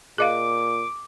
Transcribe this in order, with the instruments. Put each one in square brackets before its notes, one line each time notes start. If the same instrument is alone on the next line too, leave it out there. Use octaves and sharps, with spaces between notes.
[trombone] A#2 [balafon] G#4 D#5 F5 [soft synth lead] D6